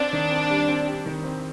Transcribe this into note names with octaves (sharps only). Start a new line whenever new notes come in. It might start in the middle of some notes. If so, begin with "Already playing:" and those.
Already playing: C4 D4
D#3
C4
G3
C4
G4
D#3
C4